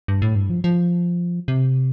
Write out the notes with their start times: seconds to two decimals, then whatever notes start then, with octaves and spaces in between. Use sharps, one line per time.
0.08 G2
0.22 A2
0.35 G2
0.50 F3
0.64 F3
1.48 C3